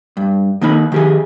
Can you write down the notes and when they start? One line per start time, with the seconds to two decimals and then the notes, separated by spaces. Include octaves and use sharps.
0.17 G2
0.61 D#3 A#3 D#4 B5
0.92 D#3 G4 G#4